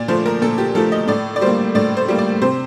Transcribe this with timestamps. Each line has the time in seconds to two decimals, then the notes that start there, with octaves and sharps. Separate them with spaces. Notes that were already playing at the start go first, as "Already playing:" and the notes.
Already playing: A#2 D5
0.08 F3 A3 C5
0.26 A#4
0.42 A#2 A4
0.58 G4
0.75 F3 A3 A4
0.92 D#5
1.08 A2 D5
1.36 D5
1.41 G3 A#3 C5
1.75 A2 D5
1.97 C5
2.08 G3 A#3
2.18 D5
2.42 C3 C5